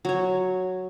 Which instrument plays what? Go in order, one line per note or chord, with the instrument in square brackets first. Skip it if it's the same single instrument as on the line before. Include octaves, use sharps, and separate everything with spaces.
[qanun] F#3 C#5